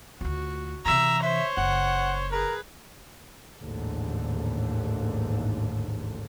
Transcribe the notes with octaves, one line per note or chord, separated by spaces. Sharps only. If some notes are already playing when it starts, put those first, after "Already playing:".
D2 F4 F#4
C3 E3 E5 A#5
C5 C#5 E5
F#1 F#5
G#4 A#4 B4
A1 D#2 G#2 D3